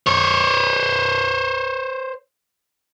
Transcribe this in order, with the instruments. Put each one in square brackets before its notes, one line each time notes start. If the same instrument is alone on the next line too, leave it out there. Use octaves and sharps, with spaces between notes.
[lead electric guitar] C5 C#5